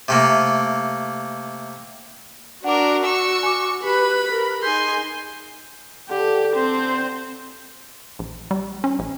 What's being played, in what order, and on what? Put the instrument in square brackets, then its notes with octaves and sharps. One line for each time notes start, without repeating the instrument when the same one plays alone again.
[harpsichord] C3 A3 A#3
[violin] D4 A#4 [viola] F#4 [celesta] F#5 D6
[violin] C#6 E6
[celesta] G#5 D6
[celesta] G4 [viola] B4 [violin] B5
[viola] A#4
[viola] D#4 G#4 [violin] G#5 C6 [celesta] G6
[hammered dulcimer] D3 [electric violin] G4
[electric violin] C4 C5
[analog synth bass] A#1
G3
C#4
A#1